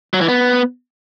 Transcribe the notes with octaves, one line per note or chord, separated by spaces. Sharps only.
F#3
E3
B3